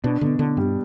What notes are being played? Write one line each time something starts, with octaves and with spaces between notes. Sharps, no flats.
B2 D4
B2 D3
D3 D4
G2 G3